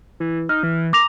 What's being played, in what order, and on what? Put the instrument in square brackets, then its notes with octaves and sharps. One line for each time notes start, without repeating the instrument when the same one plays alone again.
[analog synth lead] E3
[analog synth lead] D#4 [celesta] F6
[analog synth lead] E3
[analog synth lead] A#5 [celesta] D6 A#6 F7